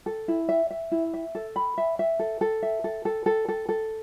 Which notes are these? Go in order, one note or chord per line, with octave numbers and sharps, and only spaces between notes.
A4
E4
E5
E5
E4
E5
A4
B5
E5
E5
A4
A4
E5
A4
A4
A4
A4
A4